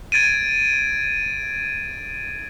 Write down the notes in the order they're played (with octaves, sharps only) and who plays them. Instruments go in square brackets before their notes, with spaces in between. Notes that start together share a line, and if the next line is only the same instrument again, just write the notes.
[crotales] G#6 A6 D7 D#7